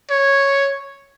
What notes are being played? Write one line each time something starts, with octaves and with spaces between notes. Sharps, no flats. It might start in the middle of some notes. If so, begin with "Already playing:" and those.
C#5